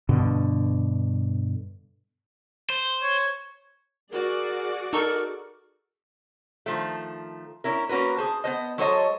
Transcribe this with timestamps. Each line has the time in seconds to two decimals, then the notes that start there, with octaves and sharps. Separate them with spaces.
0.09 G2 B2 D3
2.70 C5
3.03 C#5
4.11 F#4 G#4 A#4 D5
4.93 D#4 A4 A#4 C#6
6.66 D#3 F3 A3
7.64 C#4 E4 A#4
7.89 A#3 C#4 F#4 A#4 B4
8.17 G#4 C5 A5
8.44 B3 C5 D#5
8.78 F#3 G#3 A4 C5 C#5 D#5